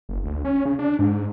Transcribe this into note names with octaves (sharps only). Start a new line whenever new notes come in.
F#1
D2
C#4
C#3
D4
G#2